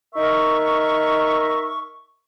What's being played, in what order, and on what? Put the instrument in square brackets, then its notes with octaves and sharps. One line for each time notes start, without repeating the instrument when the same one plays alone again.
[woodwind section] D#4 A#4 E5 C#6